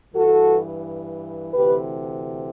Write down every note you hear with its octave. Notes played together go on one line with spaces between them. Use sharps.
G2 E3 F#4 A4
D2 C3 E3 G4 B4